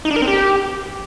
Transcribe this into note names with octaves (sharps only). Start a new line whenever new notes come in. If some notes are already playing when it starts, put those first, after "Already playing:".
D#4
D4
A#4
C4
G4